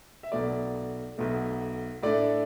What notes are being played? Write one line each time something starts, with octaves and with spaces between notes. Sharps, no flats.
E5
B1 B2 A3 D5
B1 B2 A3
A2 A3 D4 D5